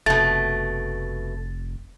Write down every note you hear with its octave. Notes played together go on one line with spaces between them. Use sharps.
F1 B2 A3 A6